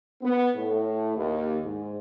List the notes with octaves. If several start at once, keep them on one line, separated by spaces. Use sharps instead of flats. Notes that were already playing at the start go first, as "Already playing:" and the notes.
B3
A2
D#2
G#2